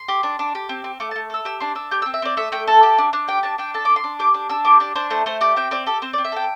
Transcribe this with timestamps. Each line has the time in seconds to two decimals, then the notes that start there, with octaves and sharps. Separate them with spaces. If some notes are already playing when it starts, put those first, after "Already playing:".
Already playing: C6
0.08 G4
0.23 D4
0.39 D4
0.55 G4
0.69 C4
0.84 C4
1.00 A3 D6
1.11 A5
1.16 A3
1.30 A4 E6
1.45 G4 E6
1.60 D4 C6
1.75 D4 E6
1.91 G4 G6
2.02 E6
2.06 C4
2.14 E5
2.22 C4 D5
2.37 A3 E5
2.52 A3 G5
2.67 A4 A5
2.83 G4
2.98 D4
3.13 D4
3.28 G4 G5
3.43 D4 A5
3.58 D4 G5
3.74 A4 A5
3.85 D4 D6
3.96 C6
4.04 D4
4.19 G4 D6
4.34 D4
4.49 D4 E6
4.65 G4 D6
4.80 D4 D5
4.95 D4 C5
5.10 A3 C5
5.26 A3 C5
5.41 G4 D5
5.56 C4 G5
5.71 C4 D5
5.86 G4 A4
6.02 C4 C5
6.13 D5
6.18 C4
6.25 E5
6.32 A4 G5